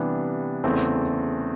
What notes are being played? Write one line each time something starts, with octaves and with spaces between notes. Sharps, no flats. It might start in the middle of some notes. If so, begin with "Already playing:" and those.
Already playing: C3 E3 G3 B3 D4
E2 C#3 E3 A3 C4